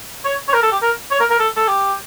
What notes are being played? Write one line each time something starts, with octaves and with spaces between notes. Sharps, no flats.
C#5
C#5
A#4
A4
G4
A#4
C#5
A#4
A#4
A4
A4
G4